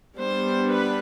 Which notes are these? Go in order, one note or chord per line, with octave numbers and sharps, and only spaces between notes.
G3 B3 D4 C5
B4